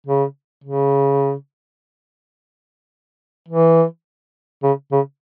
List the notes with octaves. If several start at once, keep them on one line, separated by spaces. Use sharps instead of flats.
C#3
C#3
E3
C#3
C#3